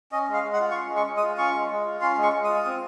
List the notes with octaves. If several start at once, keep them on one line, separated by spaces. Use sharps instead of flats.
C#4 D#5
G#3
F5
G#3
F#5
F4
C#6
C#4 C6
G#3
C#6
G#3
D#6
F4
C#4 C#6
G#3
G#3
F4
C#4 C6
G#3
C#6
G#3
D#6
F4
C4